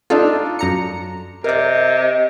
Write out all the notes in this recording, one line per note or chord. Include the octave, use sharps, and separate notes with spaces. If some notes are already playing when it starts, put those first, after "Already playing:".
D4 D#4 F4 A4
F#2 A#5 C#7
C3 A#4 D5 D#5